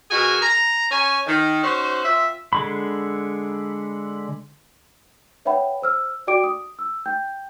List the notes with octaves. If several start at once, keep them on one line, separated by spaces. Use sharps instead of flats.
B2 F#4 G#4 A#4 G#5
A#5
C#4 C#5 G#5
D#3
C#4 D#4 F#4 C5
C4 F4 E5
D3 G#3 B5
B4 C#5 E5 F#5 G5 B5
C5 E6 F6
F#4 D5 G5 D6 D7
D#6
E6
G5 G6